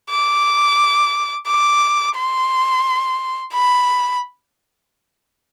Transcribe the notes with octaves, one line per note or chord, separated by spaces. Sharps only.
D6
D6
C6
B5